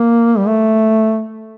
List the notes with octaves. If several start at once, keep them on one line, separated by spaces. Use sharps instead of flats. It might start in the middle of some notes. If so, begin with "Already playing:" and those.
Already playing: A#3
G3
A3